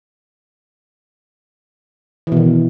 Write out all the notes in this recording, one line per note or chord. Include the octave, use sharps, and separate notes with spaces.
B2 D#3 E3